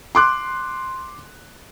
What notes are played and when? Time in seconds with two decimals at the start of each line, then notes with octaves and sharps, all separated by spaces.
0.15 C6 D6 F#6